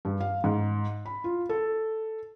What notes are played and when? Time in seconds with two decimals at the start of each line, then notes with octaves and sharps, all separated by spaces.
0.05 G2
0.20 F5
0.44 G#2
1.06 B5
1.24 F4
1.49 A4